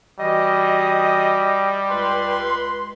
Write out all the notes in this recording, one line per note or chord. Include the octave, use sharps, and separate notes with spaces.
E3 G3 F#4 D#5
C#2 B4 C6